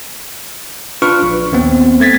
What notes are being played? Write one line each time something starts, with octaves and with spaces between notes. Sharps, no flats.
D4 F4 B4 C#6 F6
A#1
D#2 B3 C4
A3 G#6 A6 B6